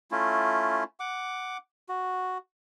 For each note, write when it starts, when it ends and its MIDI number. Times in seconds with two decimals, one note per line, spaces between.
0.11 0.84 57
0.11 0.84 61
0.11 0.84 64
0.11 0.84 65
1.00 1.57 78
1.00 1.57 86
1.89 2.38 66